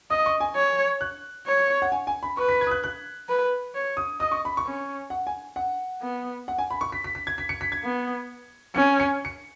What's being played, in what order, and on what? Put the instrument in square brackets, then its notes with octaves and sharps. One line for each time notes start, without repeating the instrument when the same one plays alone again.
[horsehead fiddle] D#5 [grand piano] D#6
[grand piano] C#6
G#5
[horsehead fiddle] C#5
[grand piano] F#6
[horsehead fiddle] C#5
[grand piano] F#5
G#5
G#5
B5
[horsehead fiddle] B4 [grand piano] C#6
[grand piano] B6
G#6
D#6
F#6
F#6
[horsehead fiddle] B4
C#5
[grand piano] D#6
[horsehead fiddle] D#5 [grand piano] D#6
[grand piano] C#6
B5
C#6
[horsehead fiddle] C#4
[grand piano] F#5
G#5
F#5
[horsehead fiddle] B3
[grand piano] F#5
G#5
B5
C#6
B6
B6
B6
G#6
B6
C#7
B6
G#6
[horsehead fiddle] B3
[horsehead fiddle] C#4 [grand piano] C#7
[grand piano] C#7
C#7